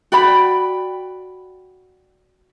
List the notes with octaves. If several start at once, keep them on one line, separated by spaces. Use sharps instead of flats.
F#4 D5 G5 B5